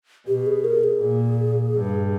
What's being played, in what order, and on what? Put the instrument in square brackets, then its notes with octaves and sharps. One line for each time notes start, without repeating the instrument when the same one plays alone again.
[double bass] B2 [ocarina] G4
[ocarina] G#4
A#4
G#4
[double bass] A#2
G2